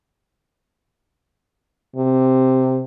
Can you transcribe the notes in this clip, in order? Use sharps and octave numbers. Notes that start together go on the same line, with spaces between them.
C3